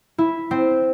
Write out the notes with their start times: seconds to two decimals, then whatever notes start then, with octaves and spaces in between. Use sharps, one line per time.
0.18 E4
0.51 C4